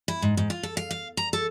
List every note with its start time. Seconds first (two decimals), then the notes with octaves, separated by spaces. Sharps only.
0.08 E4
0.22 G#2
0.37 G#2
0.50 F4
0.63 A4
0.77 F5
0.91 F5
1.17 A#5
1.33 A4